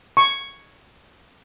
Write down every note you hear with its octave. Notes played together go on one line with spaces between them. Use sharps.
C#6